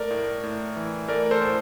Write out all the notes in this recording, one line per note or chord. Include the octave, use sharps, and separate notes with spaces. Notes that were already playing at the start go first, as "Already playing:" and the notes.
Already playing: A3 A#4 D5
A2
A2
E3
A3 A#4 D5
A4 C5
A2